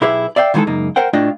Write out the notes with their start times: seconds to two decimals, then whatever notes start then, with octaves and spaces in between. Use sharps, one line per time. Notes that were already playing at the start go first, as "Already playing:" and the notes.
0.01 B1 E4 G4 G#4 B4 E5
0.36 D5 E5 F5 G5
0.54 D#3 E3 G#3 F#4 G#4 A4
0.67 C#2 F#2 A#3 D#4
0.96 A#4 C5 F#5 G5
1.13 A2 A3 D4 F4 D#5 G5